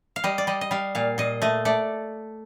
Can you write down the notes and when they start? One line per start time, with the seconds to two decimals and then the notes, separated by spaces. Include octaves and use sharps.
0.16 F5
0.24 G3 D#5
0.38 D5
0.47 G3 D#5
0.61 D#5
0.71 G3 F5
0.95 A#2 F5
1.18 A#2 D#5
1.42 A3 D#5
1.65 A3 D5